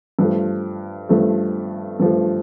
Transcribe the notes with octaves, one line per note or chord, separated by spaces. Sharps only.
G2 F3 A3
G2 F3 A3
G2 F3 A3